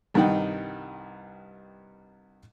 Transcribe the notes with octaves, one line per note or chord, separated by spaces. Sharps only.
C2 G2 D#3 D#4 F#5 G5